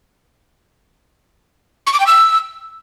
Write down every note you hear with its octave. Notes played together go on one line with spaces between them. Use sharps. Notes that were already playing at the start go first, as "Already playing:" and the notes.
C#6
D6
G5
E6